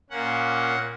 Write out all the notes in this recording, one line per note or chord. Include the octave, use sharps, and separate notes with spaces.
A#2 A#3 C#4 F#5